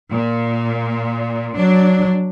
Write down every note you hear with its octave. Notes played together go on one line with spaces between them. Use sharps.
A#2
F#3 D4